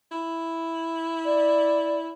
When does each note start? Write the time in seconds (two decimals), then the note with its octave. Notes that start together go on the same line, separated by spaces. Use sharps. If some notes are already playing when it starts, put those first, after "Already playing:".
0.12 E4
1.25 D5